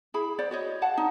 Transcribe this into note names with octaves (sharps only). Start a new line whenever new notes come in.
E4 G#4 B5
C5 D5 F#5
F#4 C#5 D#5
F5 F#5 A5
D#4